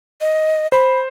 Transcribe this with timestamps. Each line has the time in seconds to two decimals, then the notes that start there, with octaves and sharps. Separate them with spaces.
0.21 D#5
0.72 C5 B5